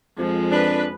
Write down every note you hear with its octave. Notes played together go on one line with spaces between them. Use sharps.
F2 F3 G#3
D4 B4